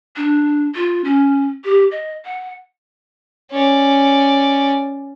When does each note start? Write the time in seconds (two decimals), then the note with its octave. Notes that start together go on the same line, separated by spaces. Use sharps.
0.17 D4
0.75 F4
1.05 C#4
1.65 G4
1.92 D#5
2.25 F#5
3.51 C#4 D5